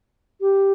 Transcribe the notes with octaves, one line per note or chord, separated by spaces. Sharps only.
G4